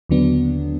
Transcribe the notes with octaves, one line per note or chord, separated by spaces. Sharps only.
D#2 D3 F#3 B3 D4